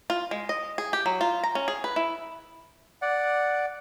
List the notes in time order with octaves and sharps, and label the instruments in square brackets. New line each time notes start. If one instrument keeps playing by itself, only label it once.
[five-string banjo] F4
G#3
D#5
G#4
G4
F#3
F4
A#5
C#4
G#4
B4
E4
[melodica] D5 F#5